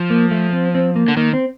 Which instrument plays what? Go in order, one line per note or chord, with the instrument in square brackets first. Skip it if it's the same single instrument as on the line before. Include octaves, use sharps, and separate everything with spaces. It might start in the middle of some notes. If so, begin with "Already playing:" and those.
Already playing: [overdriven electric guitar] F3
[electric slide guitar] A#3
A3
C4
C4
A#3
[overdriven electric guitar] D3
[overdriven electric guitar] D#3 [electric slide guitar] A#3
[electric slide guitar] C4